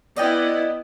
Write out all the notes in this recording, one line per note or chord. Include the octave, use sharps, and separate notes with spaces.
B3 E4 D5 D#5 G5